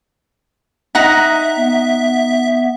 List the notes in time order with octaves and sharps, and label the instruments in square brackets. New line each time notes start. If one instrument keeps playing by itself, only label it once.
[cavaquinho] D#4 F#5 A#5 [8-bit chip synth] E5
[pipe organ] B3